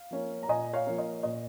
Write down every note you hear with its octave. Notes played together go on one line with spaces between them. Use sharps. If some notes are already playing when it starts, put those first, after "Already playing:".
Already playing: F5
F3 A#3 C#4
A#5
A#2 D#5 G#5
C#5 F5
F3 A#3 C#4
D#5
A#2 D#5